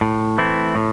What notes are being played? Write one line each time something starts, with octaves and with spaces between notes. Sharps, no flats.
A2
E3 A3 C4 E4
A2